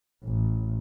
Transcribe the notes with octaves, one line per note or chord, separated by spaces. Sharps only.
A1